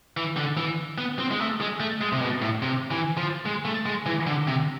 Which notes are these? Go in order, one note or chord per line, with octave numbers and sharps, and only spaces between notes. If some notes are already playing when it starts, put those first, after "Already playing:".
E3
D3
E3
B3
C4
G#3
A3
G#3
A3
G#3
C3
B2
A2
C3
E3
F3
G#3
A3
G#3
E3
D3
C3